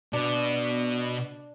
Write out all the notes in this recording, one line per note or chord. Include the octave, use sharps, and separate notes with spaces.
B2 D4